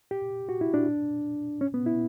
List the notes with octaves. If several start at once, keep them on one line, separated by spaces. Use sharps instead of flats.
G4
F#4
E4
D4
C#4
B3
E4